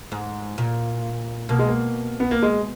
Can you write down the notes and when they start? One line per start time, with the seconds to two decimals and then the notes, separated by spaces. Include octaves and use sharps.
0.12 G#2
0.58 A#2
1.49 B2 A#3
1.59 G#3
1.68 A#3
2.20 B3
2.31 A#3
2.43 G#3